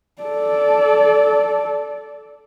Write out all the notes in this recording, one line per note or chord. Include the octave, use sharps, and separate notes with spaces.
A4 D5